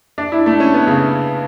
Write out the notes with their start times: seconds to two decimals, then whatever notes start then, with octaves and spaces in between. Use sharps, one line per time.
0.18 D4
0.32 E4
0.46 A3
0.60 C#4
0.74 B3
0.87 C#3